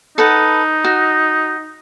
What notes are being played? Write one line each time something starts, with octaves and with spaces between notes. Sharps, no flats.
D#4 A4 B4 F#5
F#4